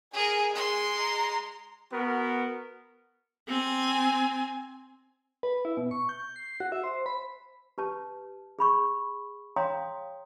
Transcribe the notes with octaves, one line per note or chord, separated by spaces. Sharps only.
G#4 A#4 G#5
G#3 G#4 C6
A#5
B3 F#4 A#4
C4 G#5
B4
E4
B2
C#6
G6
C7
F#4
E5
C5
B5
G4 B4 A5
G#4 B5 C#6
C#5 F5 G5 A#5 C6 D#6